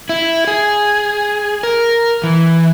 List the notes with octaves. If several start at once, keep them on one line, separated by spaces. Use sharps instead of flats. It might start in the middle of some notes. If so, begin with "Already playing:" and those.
E4
G#4
A#4
E3